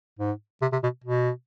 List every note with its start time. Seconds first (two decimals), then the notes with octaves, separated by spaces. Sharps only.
0.19 G#2
0.62 C3
0.72 C3
0.83 B2
1.04 B2